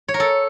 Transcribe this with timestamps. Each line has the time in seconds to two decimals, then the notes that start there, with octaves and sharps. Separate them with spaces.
0.08 C#5
0.14 A#4
0.20 A4